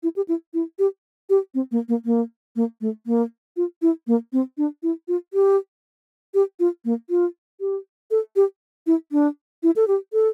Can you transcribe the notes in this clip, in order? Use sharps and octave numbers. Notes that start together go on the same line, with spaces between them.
E4
G4
E4
E4
G4
G4
C4
A#3
A#3
A#3
A#3
A3
A#3
F4
E4
A#3
C4
D4
E4
F4
G4
G4
F4
A#3
F4
G4
A4
G4
E4
D4
E4
A4
G4
A4